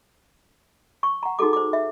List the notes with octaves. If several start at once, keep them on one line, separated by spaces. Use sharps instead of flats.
C#6
F#5 A#5
D#4 F#4 G#4 A4 D6
C5 D6
E5